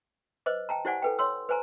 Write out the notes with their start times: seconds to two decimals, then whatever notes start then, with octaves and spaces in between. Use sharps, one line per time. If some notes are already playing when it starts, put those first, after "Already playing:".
0.46 B4 C5 D#5 D6
0.69 G5 A5 A#5
0.85 E4 G4 C5 D5 F#5 G#5
1.02 A4 B4 G5
1.19 C#5 C6 E6
1.49 B4 C5 G#5 A#5